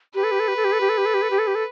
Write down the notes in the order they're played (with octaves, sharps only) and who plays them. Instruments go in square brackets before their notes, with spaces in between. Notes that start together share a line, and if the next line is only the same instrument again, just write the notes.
[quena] G4 [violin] B4
[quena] A4
G4
A4
G4
A4
G4
A4
G4
A4
G4
A4
G4
A4
G4
A4
G4
A4